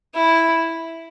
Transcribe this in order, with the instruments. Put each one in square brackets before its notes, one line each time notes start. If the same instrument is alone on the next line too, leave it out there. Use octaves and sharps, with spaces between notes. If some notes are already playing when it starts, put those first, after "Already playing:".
[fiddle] E4